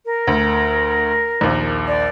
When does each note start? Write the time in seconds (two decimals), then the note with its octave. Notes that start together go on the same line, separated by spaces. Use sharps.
0.06 A#4
0.27 D2
1.41 A#1 D#2
1.87 D5